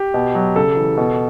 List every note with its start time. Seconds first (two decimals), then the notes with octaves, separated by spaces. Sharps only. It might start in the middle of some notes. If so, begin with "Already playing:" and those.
Already playing: G4
0.14 B2
0.35 F#3
0.56 C#3 A4
0.77 E3
0.97 B2